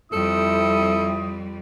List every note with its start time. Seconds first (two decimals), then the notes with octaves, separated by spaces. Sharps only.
0.12 F2 G3 C4 E4 A4 D#6